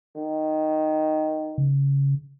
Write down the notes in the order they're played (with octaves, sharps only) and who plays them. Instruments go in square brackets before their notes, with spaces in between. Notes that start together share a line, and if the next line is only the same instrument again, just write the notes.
[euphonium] D#3
[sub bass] C#3